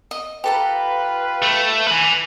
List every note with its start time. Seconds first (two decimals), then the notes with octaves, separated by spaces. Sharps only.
0.11 D#5
0.44 F4 G4 A4 B4 A#5
1.43 A3
1.88 B4 G#5